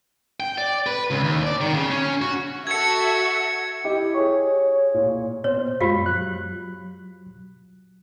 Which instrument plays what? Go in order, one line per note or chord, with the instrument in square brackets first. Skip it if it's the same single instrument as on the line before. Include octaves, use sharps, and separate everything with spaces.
[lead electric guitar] G5
D5
B4
C#2
D#2
D5
D#3
C#3
C#4
F#4
[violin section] F#4 A4 E5 [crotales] G#6 C#7
[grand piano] E4 G4 D#5
[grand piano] G#4 C#6 [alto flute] C#5
[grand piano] A#2
[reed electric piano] A#2 B3 C5 [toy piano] C#5
[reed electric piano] F#2 G#3 [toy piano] F4 G4 F5
[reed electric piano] F#3 F#6